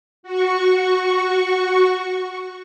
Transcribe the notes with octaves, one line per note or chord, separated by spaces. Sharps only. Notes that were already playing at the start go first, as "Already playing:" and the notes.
F#4 C#6